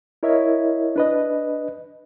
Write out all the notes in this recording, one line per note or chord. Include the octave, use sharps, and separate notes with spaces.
E4 A#4 C#5 D#5 E5
D4 B4 D#5